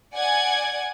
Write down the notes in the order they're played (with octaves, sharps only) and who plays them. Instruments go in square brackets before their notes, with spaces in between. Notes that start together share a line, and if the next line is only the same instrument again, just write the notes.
[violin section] D5 F#5 G#5 G#6